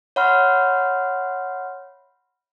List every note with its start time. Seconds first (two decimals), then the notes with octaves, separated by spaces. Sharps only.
0.16 C#5 E5 F#5 B5 C6 F6